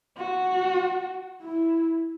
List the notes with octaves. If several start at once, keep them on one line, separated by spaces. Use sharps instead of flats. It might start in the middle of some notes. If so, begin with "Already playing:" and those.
F#4
E4